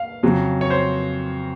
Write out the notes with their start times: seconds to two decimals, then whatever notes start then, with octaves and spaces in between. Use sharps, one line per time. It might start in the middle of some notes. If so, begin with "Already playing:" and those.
Already playing: F5
0.23 F2 C#3 F#3
0.61 C#5
0.70 C5